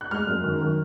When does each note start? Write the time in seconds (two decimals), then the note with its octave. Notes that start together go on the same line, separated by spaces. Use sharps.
0.01 F#6
0.11 G#3 F6
0.27 F#2
0.44 D#3
0.61 D#3